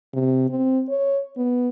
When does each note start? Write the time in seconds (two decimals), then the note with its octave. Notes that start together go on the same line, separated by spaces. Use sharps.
0.13 C3
0.49 C4
0.89 C#5
1.37 B3